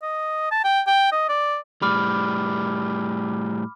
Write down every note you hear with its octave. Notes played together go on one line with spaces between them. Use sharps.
D#5
A5
G5
G5
D#5
D5
A2 G3 B5 D6 F6